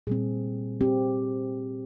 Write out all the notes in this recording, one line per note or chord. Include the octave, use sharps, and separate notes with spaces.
A#2 G3 C4 G#4
C4 G4